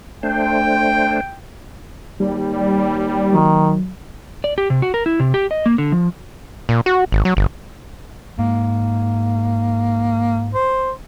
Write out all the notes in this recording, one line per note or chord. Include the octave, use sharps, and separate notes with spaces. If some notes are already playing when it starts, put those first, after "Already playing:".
A3 D4 C5 G5
D#2 G3
D#3 F#3
D5
G4
C3
F#4
A#4
E4
C3
G4
D#5
A#3
D3
F3
A#2
F#4
G#1
F#3
G1
G#2 A#3
C5